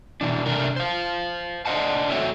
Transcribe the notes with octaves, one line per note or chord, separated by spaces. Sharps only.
B2 E3 D4
C3 A3 D4 A#4
C5 F5
D4 C5 D#5 F#5 A5
A3 C4 F#4 C#5 E5